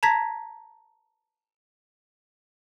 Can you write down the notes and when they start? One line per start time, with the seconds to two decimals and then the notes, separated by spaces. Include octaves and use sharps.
0.03 A5 A#5 G#6 A#6 B6